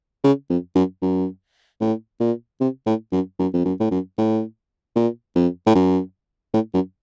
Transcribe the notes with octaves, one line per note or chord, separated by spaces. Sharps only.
C#3
F2
F#2
F#2
A2
A#2
C3
A2
F#2
F#2
F2
F#2
A2
F#2
A2
A#2
F2
A2
F#2
A2
F#2